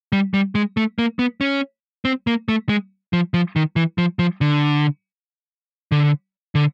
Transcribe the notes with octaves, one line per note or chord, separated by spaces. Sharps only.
G3
G3
G#3
A3
A#3
B3
C#4
C4
A#3
A3
G#3
F3
F3
D#3
E3
F3
F3
D3
D3
D3